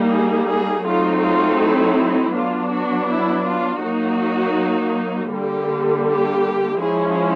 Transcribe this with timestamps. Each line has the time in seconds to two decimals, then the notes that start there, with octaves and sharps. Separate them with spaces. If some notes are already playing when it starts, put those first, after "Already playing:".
Already playing: G3 A#3 D#4
0.11 G#4
0.49 G#4
0.86 F#3 A3 C4 D#4 F4
1.23 F4
1.61 E4
2.34 F#3 B3 D4 F4
2.71 F#4
3.09 E4
3.46 F4
3.83 F#3 A#3 D#4 F#4
5.32 D3 G3 A#3 G4
6.05 G4
6.79 F3 G#3 C#4 E4 G#4